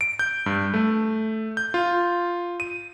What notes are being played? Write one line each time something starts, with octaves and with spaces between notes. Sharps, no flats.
D7
G6
G2
A3
G6
F4
D#7